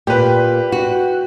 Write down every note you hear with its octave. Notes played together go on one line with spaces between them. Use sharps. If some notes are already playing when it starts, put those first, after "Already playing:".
A#2 G4 B4
F#4